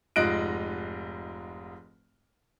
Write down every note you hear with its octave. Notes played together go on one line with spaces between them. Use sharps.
F1 G#2 F4 D#5 F#6 D7